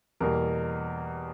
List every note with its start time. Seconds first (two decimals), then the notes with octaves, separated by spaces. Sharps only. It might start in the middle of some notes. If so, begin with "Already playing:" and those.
0.20 E2 B2 G3 A#3 A#4